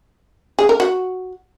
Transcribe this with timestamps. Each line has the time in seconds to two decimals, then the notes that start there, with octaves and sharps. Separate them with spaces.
0.59 G#4
0.69 A#4
0.80 F#4